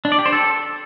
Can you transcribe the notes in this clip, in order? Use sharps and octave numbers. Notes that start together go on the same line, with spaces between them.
D4
D5
G4
C5
A4